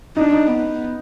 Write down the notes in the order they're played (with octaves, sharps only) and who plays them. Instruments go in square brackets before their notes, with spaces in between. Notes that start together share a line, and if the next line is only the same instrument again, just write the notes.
[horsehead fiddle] D4 [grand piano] D#4
[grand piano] D#4
[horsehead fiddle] B3